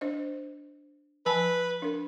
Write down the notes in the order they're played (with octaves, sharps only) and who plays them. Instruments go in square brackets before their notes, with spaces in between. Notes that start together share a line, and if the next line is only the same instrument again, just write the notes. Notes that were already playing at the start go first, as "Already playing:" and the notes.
[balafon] D4 C5 D#5
[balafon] F3 G#5 A5 [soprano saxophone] B4
[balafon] D4 A#4